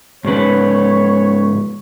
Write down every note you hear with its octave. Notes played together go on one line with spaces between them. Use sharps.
G#2 C#3 B4 C#5